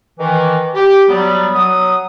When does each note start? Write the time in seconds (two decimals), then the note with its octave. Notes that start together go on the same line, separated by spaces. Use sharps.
0.19 D#3 E3
0.75 G4
1.09 F#3 G3 B3
1.55 F#3 D#6